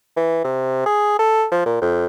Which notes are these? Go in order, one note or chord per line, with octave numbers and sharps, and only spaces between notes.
E3
C3
G#4
A4
F3
A#2
F2